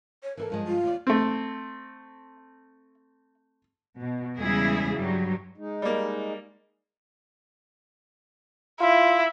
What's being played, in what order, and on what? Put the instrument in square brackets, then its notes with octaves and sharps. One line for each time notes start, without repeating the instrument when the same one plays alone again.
[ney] C#5
[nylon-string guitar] E3 E4 A4 [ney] A#4
[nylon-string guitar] G2 F3 G#3
[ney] F4
[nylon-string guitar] D#2 D5
[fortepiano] A3 C4
[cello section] B2
E2 C#3 G3 G#3 E4 G#4
G2 F#3 G3
[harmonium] G#3 D#4
[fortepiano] G3 A#3
[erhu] E4 [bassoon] F4